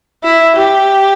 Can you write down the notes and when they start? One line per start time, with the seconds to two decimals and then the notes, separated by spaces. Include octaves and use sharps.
0.24 E4
0.55 G4